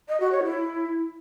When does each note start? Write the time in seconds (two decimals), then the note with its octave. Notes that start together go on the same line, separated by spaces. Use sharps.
0.08 D#5
0.20 F#4
0.31 C#5
0.43 E4